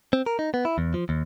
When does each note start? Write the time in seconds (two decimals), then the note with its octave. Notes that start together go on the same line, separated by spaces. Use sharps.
0.13 C4
0.26 A#4
0.39 D#4
0.54 B3
0.65 E4
0.78 E2
0.94 F3
1.09 D#2